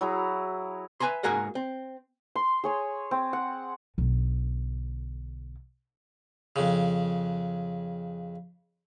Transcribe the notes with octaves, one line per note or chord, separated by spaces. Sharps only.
F#3 E4 G#4 A#5
B4 E5 G#5 A#5 C6
G#2 A#3 F#4 G#4 A#4 F#5
C4
C6
G#4 C#5 G#5
C4
F#5
B1 D3
F2 C#3